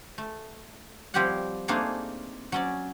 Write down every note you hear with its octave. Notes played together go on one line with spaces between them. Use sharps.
A3
F3 G3 C4 G4 C#5 F#5
A3 A#3 C4 D4 D#4 G#4
F#3 C#4 D5